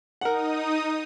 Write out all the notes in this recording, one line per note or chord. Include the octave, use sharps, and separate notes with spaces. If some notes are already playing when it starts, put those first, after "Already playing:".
D#4 A#4 F#5 D#6